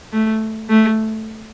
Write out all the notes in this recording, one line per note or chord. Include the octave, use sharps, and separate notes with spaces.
A3
A3